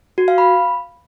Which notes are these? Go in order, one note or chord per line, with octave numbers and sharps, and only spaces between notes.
F#4
F5
B5